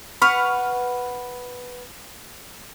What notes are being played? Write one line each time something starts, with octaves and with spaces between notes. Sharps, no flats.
B4 F#5 B5 C#6 F6